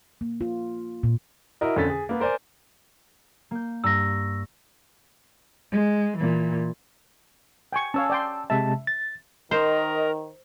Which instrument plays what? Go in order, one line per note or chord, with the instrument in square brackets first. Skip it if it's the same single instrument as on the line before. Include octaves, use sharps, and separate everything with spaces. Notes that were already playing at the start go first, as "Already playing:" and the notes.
[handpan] A#3
F4
A#2
[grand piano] E4 F#4 A#4 D#5
F2 D3 C#4 A4 A6 B6
G#4
A#3 B3
A#4 C5 D5 G#5
[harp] A#3 G6
[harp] G2 A#5 C#6 [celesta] E6 A#6
[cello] G#3
A#2 E3
[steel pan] G5 G#5 C#6
[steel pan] C#4 C#5 F5 [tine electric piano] A5 E6
[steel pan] D5 G5 C6
[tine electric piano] C3 G#3 A5 [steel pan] E5
[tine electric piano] A6
[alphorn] D#3 [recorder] A#4 [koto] C5 [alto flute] D#5